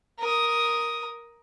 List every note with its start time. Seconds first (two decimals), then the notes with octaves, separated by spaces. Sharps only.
0.19 A#4 D#6